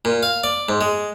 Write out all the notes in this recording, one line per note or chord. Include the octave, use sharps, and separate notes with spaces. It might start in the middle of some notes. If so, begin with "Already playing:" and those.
A#2
F5
D5
G#2
G#3